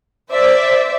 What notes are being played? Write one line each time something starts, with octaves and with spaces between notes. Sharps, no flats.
C5 D5 E5